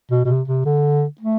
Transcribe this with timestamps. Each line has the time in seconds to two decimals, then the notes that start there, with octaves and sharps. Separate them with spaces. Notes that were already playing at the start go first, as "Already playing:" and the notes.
0.11 B2
0.25 B2
0.29 C3
0.48 C3
0.65 D3
1.21 A3